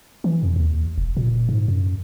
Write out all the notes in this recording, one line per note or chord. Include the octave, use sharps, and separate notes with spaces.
E3
F2
D#2
E1
A#2
G#2
F#2